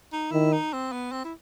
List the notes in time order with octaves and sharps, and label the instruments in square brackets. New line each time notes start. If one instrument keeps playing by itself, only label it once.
[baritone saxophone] D#4
[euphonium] D#3 [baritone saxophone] E4
[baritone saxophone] D#4
C4
B3
C4
E4